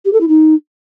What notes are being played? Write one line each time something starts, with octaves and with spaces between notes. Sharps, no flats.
G4
A4
E4
D#4